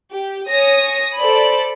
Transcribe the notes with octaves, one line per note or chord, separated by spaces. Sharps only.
G4
C#5 G#5 D#6 A#6
A4 C5 D5 B5